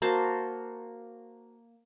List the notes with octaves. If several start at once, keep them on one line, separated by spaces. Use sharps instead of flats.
A#3 F#4 C5 A5